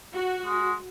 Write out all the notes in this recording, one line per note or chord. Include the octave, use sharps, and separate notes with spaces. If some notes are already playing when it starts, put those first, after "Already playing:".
F#4
G#3